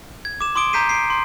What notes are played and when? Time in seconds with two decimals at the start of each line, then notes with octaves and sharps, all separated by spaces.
0.25 G#6
0.41 D6 E7
0.55 C6 D6 D#6 D7 G7
0.73 A#5 G6 B6 C7 D#7
0.89 C7 D7
1.10 C6